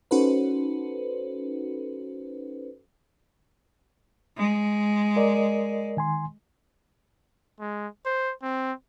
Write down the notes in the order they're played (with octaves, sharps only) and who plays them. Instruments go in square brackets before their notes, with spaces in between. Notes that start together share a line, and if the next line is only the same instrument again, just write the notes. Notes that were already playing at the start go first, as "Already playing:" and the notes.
[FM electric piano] C#4 D#4 F#4 A4 B4 C5
[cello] G#3
[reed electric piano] A#4 D5 D#5
D#3 G#5 C6
[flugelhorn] G#3
C5
C4